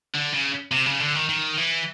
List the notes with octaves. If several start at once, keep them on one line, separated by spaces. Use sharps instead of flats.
D3
C#3
C3
C#3
D3
D#3
D#3
E3